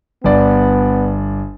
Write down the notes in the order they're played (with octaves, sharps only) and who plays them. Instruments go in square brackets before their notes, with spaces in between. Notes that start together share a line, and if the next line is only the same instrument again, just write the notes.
[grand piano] G1 D5 [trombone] B3